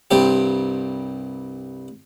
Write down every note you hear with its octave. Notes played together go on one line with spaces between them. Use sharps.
C2 G2 C4 G4